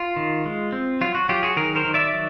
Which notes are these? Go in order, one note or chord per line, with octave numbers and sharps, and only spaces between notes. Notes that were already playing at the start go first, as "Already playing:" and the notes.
Already playing: F4
D#3
G#3
C4
F#3 F4
F#4
F#3 F4 G4
F#4 G#4
D#3 G#4 A#4
A#4 C5
D#3
D5 E5
F#3